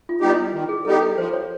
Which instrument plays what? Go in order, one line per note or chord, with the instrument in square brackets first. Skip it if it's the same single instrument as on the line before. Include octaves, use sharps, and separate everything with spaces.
[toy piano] F4
[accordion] G3 B3 D#4 G4
[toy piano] E4
[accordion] D#3
[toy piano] G#4
[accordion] G3 B3 D#4 G4 [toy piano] A4
[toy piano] A#4
[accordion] F3 [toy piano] C5
[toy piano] C#5